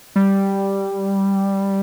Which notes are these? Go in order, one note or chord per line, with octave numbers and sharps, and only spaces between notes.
G3